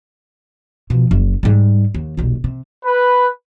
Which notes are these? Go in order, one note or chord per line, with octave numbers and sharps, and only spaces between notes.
B2 F3
F#1 F#2
G#2 G3
D#2
D#1 B1
C3
B4